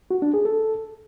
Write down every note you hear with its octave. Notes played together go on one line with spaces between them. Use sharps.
F#4
D4
G#4
A4